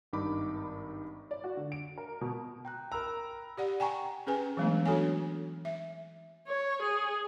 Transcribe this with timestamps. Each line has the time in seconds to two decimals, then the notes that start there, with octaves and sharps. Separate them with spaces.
0.13 G#1 G2 D#3 D#4 B5 D6
1.31 D5
1.44 F#4
1.57 D3
1.72 D7
1.98 A#4
2.21 B2
2.65 G5 A#5 F#6
2.92 A#4 A#5 B5 E6 F#6
3.57 G4 D5 F#5
3.80 G5 G#5 A#5 C#6
4.27 C#4 G#4 B4 G#5
4.57 E3 F#3 G#3 A3 B3 D4
4.86 D4 F#4 A4 C#5 G#5
5.65 E5
6.48 C#5
6.82 G#4